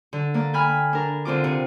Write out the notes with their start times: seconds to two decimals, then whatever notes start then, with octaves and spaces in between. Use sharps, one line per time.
0.13 D3
0.34 A#3 D5
0.53 G5 G#5 B5 F6
0.93 D4 A#4
1.25 D3 C4 F4 D6
1.44 C3